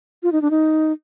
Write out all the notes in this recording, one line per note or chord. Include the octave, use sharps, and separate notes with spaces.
F4
D#4
D4
D#4